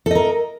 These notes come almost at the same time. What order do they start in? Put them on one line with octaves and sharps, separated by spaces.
A4 D#5 A#4